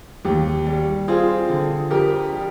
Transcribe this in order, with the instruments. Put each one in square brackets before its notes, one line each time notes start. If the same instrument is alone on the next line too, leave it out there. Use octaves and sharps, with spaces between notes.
[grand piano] D#2 G4
G3
C4 F4 G#4
D3
F2 G4 A#4
G3